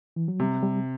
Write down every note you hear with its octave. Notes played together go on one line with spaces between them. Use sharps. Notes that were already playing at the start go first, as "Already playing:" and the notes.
E3
F#3
C3 G3
G3